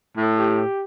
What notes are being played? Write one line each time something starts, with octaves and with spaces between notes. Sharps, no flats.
A2
G4